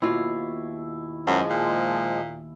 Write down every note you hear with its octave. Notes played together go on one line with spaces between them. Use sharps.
D#2 B2 E4 F4
F#2 F3 G#3
A#2